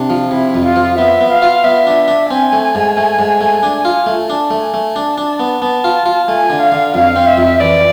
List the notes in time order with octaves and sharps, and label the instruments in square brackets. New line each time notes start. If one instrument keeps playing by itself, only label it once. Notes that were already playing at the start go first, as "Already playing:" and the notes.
Already playing: [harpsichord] C3 [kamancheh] D4
[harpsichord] F3
[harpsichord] C3 [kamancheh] E4
[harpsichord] F2
[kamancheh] F4
[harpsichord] F3
[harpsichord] B3 [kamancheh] E5
[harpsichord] B3
[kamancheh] F5
[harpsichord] F4
[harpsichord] B3 [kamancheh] E5
[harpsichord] D4
D4
[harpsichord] C4 [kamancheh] G#5
[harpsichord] A3
G#2
A3
G#2
A3
D4
F4
A3
[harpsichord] D4 [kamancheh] A5
[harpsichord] A3
[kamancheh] G#5
[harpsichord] A3
[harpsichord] D4 [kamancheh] A5
[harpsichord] D4
B3
[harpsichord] B3 [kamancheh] A5
[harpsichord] F4
F4
[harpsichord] A3 [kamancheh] G#5
[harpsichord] D3
[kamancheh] F5
[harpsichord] D3
[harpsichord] F2 [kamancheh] F5
[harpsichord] C4
[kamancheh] E5
[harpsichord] F2
[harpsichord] E3 [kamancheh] D5